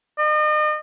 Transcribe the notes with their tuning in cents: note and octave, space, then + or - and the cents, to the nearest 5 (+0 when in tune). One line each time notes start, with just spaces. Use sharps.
D#5 -40